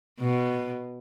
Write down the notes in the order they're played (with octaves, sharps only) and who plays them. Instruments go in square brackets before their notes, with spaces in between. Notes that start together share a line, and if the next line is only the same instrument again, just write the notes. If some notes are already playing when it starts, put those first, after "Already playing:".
[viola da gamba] B2